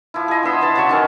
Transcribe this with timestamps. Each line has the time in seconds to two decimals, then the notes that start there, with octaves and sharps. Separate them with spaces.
0.14 F3 E4
0.28 G#4 D#5
0.43 D3 B3 E5 C6
0.61 E3 A5
0.76 C#3 F#3 C#6
0.89 D#3 C#4 A4